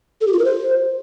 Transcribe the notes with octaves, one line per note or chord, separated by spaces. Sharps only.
A4
G4
F4
A#4
C5